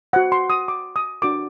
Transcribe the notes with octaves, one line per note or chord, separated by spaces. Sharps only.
F#4 C5 F#5
C6
D#6
D6
D#6
D4 F#4 A#4 D6